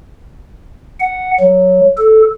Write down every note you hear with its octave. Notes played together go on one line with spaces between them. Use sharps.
F#5
F#3
A4